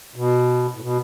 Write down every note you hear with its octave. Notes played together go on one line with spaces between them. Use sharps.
B2
A2
B2